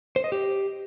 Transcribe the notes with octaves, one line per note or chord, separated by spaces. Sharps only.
C5
D#5
G4